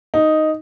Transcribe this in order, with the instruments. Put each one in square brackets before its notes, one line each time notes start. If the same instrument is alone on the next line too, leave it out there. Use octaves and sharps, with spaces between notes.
[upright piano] D#4